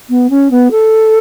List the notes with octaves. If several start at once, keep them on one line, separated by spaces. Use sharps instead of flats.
B3
C#4
B3
A4